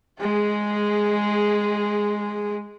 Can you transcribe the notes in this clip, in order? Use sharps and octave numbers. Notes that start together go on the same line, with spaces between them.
G#3 G#4